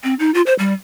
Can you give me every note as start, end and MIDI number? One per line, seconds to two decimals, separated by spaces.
0.04 0.14 60
0.19 0.32 63
0.34 0.42 65
0.46 0.54 72
0.59 0.74 55